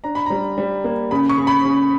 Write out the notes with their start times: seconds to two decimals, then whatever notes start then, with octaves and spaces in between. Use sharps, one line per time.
0.04 D4 A#5
0.15 B5
0.26 G3 A#5
0.58 G3
0.84 A#3
1.11 C#3 B5
1.29 C#6
1.38 C#3
1.47 B5
1.65 C#3